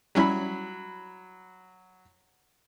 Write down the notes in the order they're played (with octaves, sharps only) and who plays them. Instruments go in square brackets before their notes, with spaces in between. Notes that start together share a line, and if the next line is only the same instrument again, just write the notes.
[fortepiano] F#3 B5 [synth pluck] G3 C#4 E4